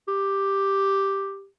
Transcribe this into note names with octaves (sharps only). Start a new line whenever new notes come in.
G4